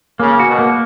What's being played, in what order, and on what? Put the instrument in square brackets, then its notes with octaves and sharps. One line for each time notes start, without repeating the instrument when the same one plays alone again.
[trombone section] C#3 [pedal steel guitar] A#3
[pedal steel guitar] F#4
[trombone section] B2
[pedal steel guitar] A#3